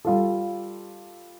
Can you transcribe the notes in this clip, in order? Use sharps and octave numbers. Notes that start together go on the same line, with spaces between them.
G3 F4 A4